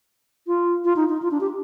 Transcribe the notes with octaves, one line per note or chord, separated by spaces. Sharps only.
F4
F4
D#4
D#4
F4
D4
G4